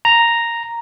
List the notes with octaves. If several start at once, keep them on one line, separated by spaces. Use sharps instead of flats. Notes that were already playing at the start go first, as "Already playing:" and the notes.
A#5